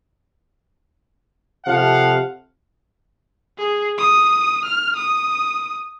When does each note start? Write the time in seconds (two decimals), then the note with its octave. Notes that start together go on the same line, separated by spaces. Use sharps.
1.66 C3 F3 A4 F5 F#5
3.58 G#4
3.98 D#6
4.65 F6
4.96 D#6